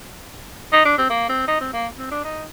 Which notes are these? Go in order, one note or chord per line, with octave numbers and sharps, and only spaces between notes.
D#4
D4
C4
A#3
C4
D#4
C4
A#3
C4
D4
D#4